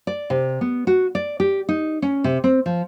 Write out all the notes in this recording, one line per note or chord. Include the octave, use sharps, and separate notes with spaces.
D5
C3
B3
F#4
D5
G4
D#4
C#4
C3
C4
F3